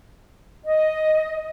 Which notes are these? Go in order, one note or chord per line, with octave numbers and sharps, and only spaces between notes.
D#5